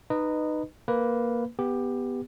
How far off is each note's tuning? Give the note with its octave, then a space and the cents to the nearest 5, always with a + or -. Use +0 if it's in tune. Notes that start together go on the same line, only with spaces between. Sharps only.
D#4 -20 B4 +0 D#5 -15
A#3 +5 B4 +0
B3 +0 G4 +15